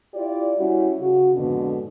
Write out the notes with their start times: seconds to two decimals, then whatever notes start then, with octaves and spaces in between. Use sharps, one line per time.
0.14 E4 F4 G4 D5
0.56 G3 C#4 E4 F#4 G4
0.98 C#3 F#4
1.35 F2 G#2 B2 D3